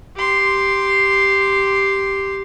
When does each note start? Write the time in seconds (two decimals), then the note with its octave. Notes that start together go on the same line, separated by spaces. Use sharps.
0.16 G4 C6